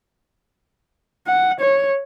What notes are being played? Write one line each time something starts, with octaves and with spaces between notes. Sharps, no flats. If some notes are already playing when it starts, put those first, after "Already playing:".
F#5
C#5